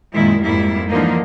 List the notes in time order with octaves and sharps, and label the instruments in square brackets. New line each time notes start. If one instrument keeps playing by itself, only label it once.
[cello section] F#2 A#2 D#3 G#3 E4
F2 G#2 G3 A#3 E4
D3 E3 F3 A#3 D#4